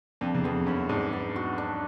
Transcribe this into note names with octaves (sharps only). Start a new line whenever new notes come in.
F2 D4
E2
F2 B3
F#2 B3
G#2 D4
B3
F#4
D4